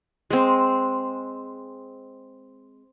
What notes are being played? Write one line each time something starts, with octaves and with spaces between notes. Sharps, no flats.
G#3 C4